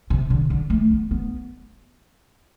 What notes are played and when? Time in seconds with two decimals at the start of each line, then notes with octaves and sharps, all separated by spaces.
0.10 C3
0.30 D3
0.50 D3
0.70 A3
0.90 B3
1.11 B3